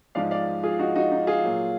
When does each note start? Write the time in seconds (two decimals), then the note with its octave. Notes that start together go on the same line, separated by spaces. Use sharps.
0.15 G#2 F3 G#3 D5 F5
0.31 D5 F5
0.63 F4 G#4
0.79 D#4 F#4
0.96 D#4 F#4
1.11 D#4
1.27 F4 G#4
1.43 A#2 F#3